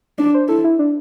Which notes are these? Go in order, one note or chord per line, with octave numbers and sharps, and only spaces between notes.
D4 D5
C5
E4 A4
E4
D4